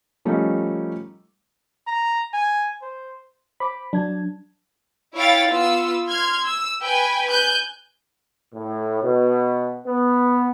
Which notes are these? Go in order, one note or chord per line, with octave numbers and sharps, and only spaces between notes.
F3 G3 A3 C#4 D#4
A#5
G#5
C5
C5 B5 D6
F#3 D4 A5 G#6
E4 C#5 F5 G5 A6
B3 F4 E6
C6 F6 G#6
E6
B4 G5 G#5
G#5 F#6 G6
A2
B2
B3